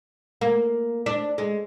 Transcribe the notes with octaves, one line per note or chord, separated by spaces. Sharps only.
A#3
D4
G#3